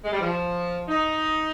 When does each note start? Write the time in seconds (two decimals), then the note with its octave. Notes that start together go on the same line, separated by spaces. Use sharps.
0.04 G#3
0.12 G3
0.21 F3
0.89 D#4